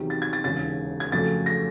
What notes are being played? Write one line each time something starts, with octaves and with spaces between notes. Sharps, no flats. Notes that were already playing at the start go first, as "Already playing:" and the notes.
Already playing: E2 C3 D#3 F#3
A6
G#6
A6
E1 D#2 C#3 A6
G#6
F2 C#3 F#3 A3 A6
A#6